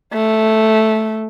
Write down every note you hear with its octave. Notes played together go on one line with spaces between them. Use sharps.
A3